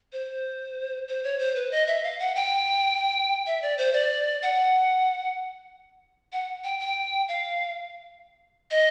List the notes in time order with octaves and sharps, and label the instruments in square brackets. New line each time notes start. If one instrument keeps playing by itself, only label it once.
[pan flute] C5
C5
C#5
C5
B4
D#5
E5
F5
F#5
G5
E5
D5
C5
D5
F#5
F#5
G5
G5
F5
D#5